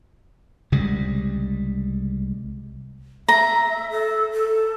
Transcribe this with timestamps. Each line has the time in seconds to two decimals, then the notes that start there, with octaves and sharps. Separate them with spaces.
0.72 C2 C#3 G3 G#3
3.28 E5 A#5
3.90 A4
4.33 A4